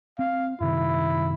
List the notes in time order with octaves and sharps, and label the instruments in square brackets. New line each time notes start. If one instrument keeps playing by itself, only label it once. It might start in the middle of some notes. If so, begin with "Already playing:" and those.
[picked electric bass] C4 [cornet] F5
[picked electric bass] F#2 C3 D#3 [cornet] E4